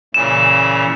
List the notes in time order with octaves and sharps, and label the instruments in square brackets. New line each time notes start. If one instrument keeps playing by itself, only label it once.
[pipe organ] A#2 C#3 E3 [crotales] E7